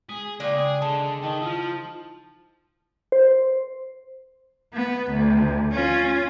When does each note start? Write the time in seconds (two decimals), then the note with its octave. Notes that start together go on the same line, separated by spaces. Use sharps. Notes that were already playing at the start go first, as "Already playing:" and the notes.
0.09 G#3 G#4
0.40 C#3 A#3 D4 F4 G5
0.55 G#4
0.82 D3 G#3 A5
1.23 D#3 D#4 D#5 G5
1.42 F3 E4 F4
3.12 C5
4.74 B3
5.12 D2
5.72 C#4 F4